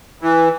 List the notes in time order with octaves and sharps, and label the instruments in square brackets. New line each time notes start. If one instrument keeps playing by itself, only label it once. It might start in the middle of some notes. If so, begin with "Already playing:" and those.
[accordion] E3